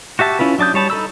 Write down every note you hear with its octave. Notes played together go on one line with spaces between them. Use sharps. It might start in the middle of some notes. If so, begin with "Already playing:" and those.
F#4 G4 E5 A5
C#4 E4 F4 B4
F#3 D4 A5 D#6 G6
G3 C#5 A5 B5
D#4 A4 B5 E6